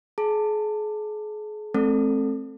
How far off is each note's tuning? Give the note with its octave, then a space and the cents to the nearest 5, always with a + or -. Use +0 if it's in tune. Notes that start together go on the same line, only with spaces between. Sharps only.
G#4 +35 A5 +25
A3 -45 C4 +15 A4 +5